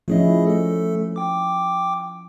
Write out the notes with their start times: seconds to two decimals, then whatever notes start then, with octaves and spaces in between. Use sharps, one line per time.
0.08 F3 A3 C#4 E4 G#4 D#5
0.47 A3 A4
1.16 G5 D6